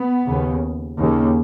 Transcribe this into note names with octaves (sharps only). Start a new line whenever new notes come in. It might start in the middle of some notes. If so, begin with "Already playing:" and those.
Already playing: B3
D#2 C#3
D#2 C#3